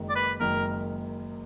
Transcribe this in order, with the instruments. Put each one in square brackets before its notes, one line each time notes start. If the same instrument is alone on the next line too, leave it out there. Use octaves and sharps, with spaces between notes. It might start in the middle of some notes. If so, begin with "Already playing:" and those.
Already playing: [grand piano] F#1 F#2 D#3 G#3
[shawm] D5
B4
[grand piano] F#1 F#2 D#3 G#3 [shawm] A#4